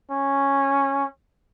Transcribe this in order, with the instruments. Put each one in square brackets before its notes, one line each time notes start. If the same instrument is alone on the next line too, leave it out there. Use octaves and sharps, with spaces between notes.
[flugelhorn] C#4